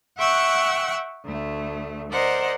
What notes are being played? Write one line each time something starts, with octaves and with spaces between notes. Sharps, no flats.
E5 F#5 G5 C#6 E6 F#6
D2 A3
A#4 C5 D5 D#5 F#5